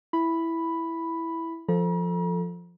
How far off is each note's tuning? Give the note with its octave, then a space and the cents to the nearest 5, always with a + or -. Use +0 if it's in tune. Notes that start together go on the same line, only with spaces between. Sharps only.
E4 +0 B5 +0
F3 +0 A4 +0 A#5 +45